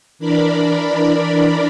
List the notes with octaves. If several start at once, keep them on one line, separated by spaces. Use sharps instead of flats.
E3 D4 A#4 D5 B5